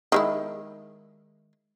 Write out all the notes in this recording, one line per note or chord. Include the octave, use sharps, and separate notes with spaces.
D#3 G#3 E4